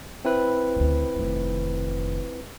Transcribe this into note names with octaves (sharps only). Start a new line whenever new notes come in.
C4 E4 B4
D2 C#3
F1 D#3